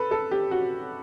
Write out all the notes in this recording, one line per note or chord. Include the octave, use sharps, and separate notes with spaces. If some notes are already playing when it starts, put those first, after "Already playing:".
Already playing: A4 B4
A4
G4
F#4